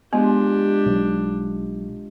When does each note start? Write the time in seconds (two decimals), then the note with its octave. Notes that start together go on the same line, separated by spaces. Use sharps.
0.13 F3 G#3 B3 D4 G4
0.86 B1